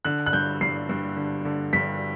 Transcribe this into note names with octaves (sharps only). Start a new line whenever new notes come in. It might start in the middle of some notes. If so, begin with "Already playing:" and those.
D3 F#6
F#6
G2 G6
G2 C7
G2
D3
D3
G2 B6